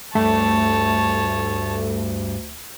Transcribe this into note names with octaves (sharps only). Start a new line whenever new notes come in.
D2 G2 A3 C#5 A5